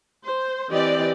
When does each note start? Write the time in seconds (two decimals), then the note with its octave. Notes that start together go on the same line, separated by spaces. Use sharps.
0.23 C5
0.71 E3 C4 G4 D5 D#5